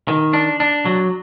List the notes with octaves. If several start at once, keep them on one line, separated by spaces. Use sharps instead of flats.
D#3
D4
D4
F#3